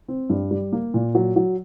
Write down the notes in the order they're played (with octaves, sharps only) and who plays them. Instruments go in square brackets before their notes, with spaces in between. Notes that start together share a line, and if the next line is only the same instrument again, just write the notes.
[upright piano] C4
G2
G3
A#3
A#2
F#3
F#3